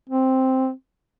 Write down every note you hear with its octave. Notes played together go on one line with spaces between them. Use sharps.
C4